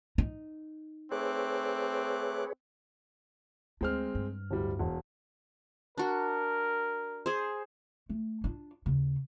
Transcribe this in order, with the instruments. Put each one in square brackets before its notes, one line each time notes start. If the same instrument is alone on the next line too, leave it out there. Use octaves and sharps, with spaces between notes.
[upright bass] D#4
[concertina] A3 D6 F#6 [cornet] C4 [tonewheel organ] G#4 B4 C#5
[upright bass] D2 [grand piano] G#3 C4 F6
[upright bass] G2
[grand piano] D1 G3
E1
[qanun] D4 F#4 [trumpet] A#4
[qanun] G#4 C5
[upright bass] A3
D4 F4
D#2 C#3